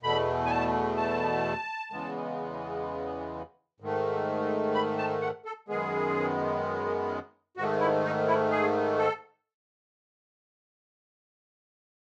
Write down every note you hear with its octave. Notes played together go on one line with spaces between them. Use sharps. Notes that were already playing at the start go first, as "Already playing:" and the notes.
E2 B2 A3 B5
G#5
A5
A5
E2 C#3 E3 G#3 B3
G#2 D#3 A3
B5
A5
F#5
A4
F#2 D#3 G#3 B3 G#4
G#2 D#3 A3 F#4
E4
D#4
E4
G#4
A4